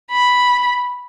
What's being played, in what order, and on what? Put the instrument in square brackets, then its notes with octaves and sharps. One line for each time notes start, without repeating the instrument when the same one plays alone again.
[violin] B5